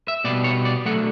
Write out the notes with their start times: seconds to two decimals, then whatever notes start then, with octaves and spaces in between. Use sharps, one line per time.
0.08 E5
0.24 B2 G3 B3 D5
0.44 C#5
0.65 D5
0.85 D3 F#3 A3 F#5